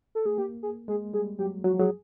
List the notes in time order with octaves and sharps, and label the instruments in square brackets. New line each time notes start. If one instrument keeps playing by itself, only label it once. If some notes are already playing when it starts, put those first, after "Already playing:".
[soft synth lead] A4
[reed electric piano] A3 [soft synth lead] G#4
[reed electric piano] A#3 [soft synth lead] G4
[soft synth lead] G#4
[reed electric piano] G#3 [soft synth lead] G#4
[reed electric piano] G3 [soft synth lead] G#4
[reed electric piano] F#3 [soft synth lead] G4
[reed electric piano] F#3 [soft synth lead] F#4
[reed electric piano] F3
[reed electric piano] F#3 [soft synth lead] G#4